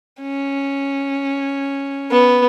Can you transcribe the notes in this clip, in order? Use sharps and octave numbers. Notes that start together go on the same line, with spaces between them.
C#4
B3